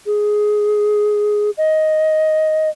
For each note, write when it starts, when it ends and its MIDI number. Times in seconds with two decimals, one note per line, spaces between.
0.06 1.50 68
1.58 2.69 75